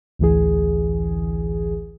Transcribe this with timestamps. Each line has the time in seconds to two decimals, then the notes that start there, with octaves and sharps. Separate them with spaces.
0.19 A1 D2 E3 G#4